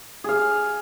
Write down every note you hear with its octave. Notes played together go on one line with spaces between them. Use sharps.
G#4 F5